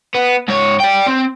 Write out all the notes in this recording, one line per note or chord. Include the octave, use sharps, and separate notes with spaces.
B3
G#2 C#5
D5 G5
C4